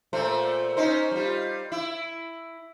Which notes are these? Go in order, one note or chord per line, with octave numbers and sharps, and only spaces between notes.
A#2 A3 C5
C#4 D#4 C5
G3 F4
E4